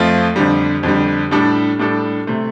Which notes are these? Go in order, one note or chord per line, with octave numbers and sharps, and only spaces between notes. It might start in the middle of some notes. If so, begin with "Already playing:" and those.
Already playing: F2 F3 A3 F4
F2 D3 G3
F2 D3 G3
A2 G3 D4 A4
A2 G3 D4 A4
C3 A3